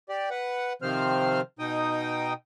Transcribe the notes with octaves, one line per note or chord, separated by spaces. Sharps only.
G4 D5
B4 F#5
C3 D#3 F3 C4 C5 F6
B2 D#4 G5 D#6